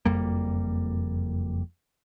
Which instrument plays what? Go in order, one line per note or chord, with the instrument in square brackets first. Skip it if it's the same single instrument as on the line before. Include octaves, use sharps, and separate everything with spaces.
[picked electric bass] F#1 F2 G3 A#3